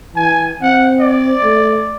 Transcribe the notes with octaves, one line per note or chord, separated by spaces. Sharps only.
E3 G#5
C4 F#5
D5
A3